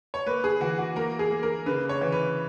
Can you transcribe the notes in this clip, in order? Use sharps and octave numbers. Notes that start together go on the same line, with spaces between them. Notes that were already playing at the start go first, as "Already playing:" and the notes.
C#5
A#3 B4
G#4
E3 F#4
F#4
A#3 A#4
G#4
A#3
A#4
C#3 B4
C#5
E3
B4